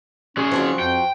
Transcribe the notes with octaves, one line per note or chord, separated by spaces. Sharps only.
F#3 C#4 G#4
F3 C4 F#4
F2 G5